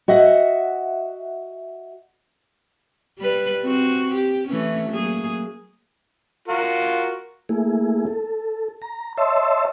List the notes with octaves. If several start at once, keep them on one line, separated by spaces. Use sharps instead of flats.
F#4 D#5 E5 F#5
G3 B4
C4 F#4
G4
E3 A3 C#4
F#3 A#3 G#4
F4 F#4 A#4
A3 A#3 E4 G#4
A4
A#5
C#5 D#5 E5 A5 C6 E6